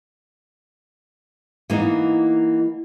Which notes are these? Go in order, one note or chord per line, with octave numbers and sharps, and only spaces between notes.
E3 A#3 B3 D#4